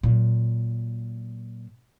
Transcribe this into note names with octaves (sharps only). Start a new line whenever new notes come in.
A#2 F#3